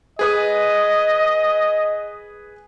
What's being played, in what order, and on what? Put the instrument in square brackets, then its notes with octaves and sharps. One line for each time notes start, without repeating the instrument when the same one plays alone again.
[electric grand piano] G#4 B4 D#6 [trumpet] D#5